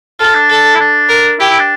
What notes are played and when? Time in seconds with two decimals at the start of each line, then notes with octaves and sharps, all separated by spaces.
0.20 F4 A4
0.35 D4
0.51 A4
0.75 E4
0.80 D4
1.09 A#4
1.39 E4 G4
1.49 E4
1.59 D4